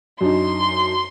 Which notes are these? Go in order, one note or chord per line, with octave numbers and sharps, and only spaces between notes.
F#2 D4 D#4 C6